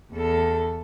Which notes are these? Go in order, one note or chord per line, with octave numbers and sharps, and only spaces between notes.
E2 A4